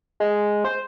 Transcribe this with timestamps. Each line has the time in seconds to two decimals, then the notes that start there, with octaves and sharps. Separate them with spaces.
0.20 G#3
0.65 C5